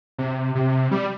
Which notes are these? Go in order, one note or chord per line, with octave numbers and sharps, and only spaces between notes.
C3
C3
G3